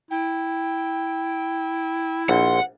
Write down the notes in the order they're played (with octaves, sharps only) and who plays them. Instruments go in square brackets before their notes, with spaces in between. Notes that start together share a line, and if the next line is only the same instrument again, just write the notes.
[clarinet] E4 [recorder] G5
[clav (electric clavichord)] A#1 [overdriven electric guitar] F#5 [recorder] C6